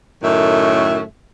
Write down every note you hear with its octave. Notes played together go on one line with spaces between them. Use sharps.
F#2 A2 D#3 A3 E5